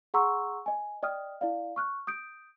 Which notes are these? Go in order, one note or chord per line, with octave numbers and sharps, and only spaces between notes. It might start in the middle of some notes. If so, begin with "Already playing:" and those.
G#4 F#5 A#5 C6 C#6 E6
D#5 G#5
D5 D#5 G5 D#6 F6
E4 D5 F5
C#6 F6 F#6
D#6 G6 D7